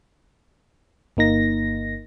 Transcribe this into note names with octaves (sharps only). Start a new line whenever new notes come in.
G1 A#3 D#4 A#6